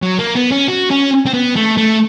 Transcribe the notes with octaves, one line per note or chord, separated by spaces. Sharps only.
F#3
A#3
B3
C#4
F#4
C#4
C4
B3
A3
A3